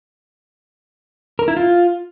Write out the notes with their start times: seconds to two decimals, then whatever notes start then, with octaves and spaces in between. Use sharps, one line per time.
1.39 A#4
1.48 E4
1.57 F4